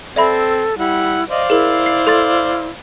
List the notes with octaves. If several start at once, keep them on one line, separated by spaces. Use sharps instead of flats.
C4 A4 D5 E5 B5
G3 E4 F#5
C5 D5 D#5 F5
E4 G#4 A#4
C7
A4 C6 A6